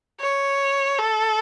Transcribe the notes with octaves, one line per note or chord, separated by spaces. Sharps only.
C#5
A4